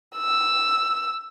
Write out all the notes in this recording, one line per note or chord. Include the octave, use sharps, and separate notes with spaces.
E6